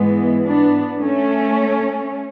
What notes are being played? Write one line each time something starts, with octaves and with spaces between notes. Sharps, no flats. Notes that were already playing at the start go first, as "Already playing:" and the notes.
Already playing: G#2 E3 G#3 B3
B3 D4
A3 C#4